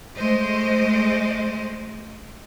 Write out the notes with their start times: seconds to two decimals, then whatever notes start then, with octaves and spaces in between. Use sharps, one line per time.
0.17 G#3 A3 C5 D#5